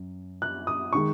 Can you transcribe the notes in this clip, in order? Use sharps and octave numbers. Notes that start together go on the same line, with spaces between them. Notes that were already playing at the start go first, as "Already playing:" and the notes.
Already playing: F#2
F#6
D#6
D#3 G#3 C#6